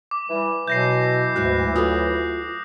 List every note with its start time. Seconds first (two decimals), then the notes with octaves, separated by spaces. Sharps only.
0.11 D6
0.29 E3 G3
0.68 B2 E3 F#3 G6 A#6 C7
1.36 D2 G#2 F#4 F#6
1.76 F4 F#4 A4 D#6